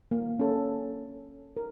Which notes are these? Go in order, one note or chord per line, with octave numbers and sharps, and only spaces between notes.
A#3
C#4 A4
A#4